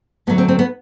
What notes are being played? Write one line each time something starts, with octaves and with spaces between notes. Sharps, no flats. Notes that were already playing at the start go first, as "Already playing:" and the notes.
D2 D3 F#3 A3 B3
C4
C4
B3